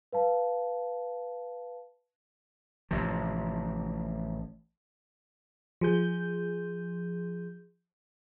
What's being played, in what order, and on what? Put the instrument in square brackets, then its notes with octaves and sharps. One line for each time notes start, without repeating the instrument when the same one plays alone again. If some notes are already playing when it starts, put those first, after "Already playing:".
[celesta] B4 F5 A5
[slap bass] A1 A2 C3 F3
[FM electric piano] F3 G#4 G6